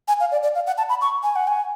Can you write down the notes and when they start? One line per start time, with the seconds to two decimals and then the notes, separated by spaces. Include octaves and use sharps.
0.08 G#5
0.20 F5
0.32 D5
0.43 D5
0.55 F5
0.67 F#5
0.78 A5
0.89 B5
1.01 C#6
1.23 G#5
1.36 F#5
1.48 G#5